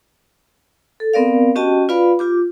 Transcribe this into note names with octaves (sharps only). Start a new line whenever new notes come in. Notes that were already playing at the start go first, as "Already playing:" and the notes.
A4
B3 C4 A#4 D5 F5
C#4 F#4 G4 D#5 G5 A5
F4 B4 D5 F5 B5
F4 G4 D6